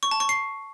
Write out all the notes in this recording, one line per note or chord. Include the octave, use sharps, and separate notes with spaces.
C#6
A5
C#6
C7